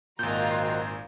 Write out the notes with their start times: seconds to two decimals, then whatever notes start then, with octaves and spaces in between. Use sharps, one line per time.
0.19 G#1 A#2 D#3 F3 F4 F#4 A#5 G6